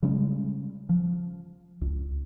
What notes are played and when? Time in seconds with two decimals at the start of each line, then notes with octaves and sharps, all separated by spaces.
0.03 C#3 G3 G#3 C#4
0.89 F3
1.81 C#2